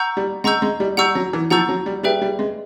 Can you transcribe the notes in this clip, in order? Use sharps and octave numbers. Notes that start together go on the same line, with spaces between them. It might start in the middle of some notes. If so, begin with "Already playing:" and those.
Already playing: F#5 A#5 C#6 E6 G6
G3
G#3 F#5 A#5 C#6 E6 G6
G#3
G3
G3 F#5 A#5 C#6 E6 G6
F#3
E3
F3 F#5 A#5 C#6 E6 G6
F#3
G3
G3 G#4 B4 E5 G5
G3
G#3